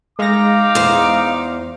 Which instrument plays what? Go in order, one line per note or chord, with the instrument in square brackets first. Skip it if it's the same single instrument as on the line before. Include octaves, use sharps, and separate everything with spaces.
[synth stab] G#3 A#6 [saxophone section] D#4 F5 [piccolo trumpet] D6
[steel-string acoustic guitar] E2 C5